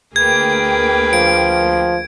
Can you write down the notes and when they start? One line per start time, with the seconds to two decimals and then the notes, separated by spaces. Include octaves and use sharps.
0.16 D2 A#3 G#4 B4 G5 G#6
1.13 F3 D7